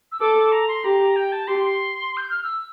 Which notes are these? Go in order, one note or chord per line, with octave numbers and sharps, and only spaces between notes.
E6
A4 D6
A#5
C6
G4 A#5
G5
A5
G4 C6
C6
G6
F6
E6